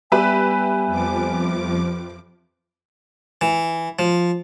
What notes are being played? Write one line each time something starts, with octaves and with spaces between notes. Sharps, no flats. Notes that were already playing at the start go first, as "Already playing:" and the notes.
G3 B3 G4 B4 E5 G#5
F2 F3 D6
E3
F3